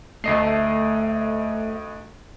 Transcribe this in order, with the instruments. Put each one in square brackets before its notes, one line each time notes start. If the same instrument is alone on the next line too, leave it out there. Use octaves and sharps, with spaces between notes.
[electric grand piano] D2 D#5 C7 [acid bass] A3